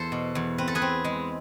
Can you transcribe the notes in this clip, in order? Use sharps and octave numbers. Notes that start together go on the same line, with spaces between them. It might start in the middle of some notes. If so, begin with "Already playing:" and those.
Already playing: E2 A4 C5
B2
E2
C4 B4
A4
G#4 B4
C4
G#3